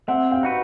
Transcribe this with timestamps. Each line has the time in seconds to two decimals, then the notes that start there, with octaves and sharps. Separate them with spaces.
0.08 C4 E5 F#5
0.31 F5 G5
0.43 D#4 F#4 B4